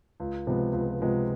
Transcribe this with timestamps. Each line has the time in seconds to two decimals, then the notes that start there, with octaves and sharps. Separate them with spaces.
0.20 C#2
0.47 C3 F3 G#3 B3
0.73 C#2
1.01 C3 F3 G#3 B3